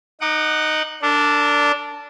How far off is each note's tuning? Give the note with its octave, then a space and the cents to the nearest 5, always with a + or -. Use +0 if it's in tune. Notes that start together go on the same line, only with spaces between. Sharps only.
D#4 -5 F#5 +5 D6 +40
D4 -10 A#4 -45